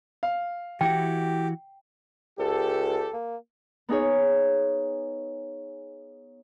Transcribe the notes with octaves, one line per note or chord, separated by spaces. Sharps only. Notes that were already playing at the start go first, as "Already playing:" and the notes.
F5
E3 E4 F#4 G4 G5
C#2 G4 A4
A#3
B3 D#4 G#4 C#5